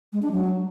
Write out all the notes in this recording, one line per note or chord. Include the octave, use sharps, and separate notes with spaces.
G#3
D4
F#3